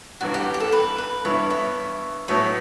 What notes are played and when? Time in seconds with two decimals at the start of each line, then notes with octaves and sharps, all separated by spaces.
0.21 A1 G2 E3 F#4
0.34 G4
0.54 G4
0.60 A4
0.72 B4
0.98 B4
1.25 G2 E3 B3 E4 C#5
1.50 C#5 E5
2.28 A2 F#3 B3 C#5 E5